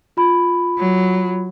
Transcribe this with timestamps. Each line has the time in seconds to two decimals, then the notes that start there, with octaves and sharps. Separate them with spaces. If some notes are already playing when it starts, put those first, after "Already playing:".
0.17 F4 B5
0.79 F#3